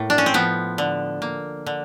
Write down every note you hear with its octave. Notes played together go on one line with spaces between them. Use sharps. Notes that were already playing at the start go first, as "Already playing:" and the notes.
Already playing: A2 A#3
D4
C#4
C4
F3 B3
D3
A#3
D3